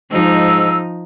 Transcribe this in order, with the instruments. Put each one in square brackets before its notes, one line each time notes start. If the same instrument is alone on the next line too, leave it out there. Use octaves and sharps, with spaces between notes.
[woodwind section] G#2 G#3 E6 [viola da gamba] F3 D#4